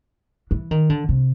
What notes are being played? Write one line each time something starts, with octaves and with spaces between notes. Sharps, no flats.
E3
D#3
D3
C3